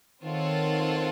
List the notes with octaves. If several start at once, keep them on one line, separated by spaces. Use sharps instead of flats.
D#3 C4 F4 A4 C#5 F#5